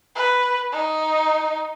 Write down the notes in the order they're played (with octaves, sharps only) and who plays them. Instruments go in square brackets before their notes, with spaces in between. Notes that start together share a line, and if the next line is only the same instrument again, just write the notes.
[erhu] B4
D#4